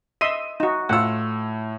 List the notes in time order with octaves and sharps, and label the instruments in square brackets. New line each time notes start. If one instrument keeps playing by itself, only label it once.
[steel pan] D#5 E5 C6 [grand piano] D#7
[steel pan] D#4 F#4
[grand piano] A2 E6 [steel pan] F4 F#5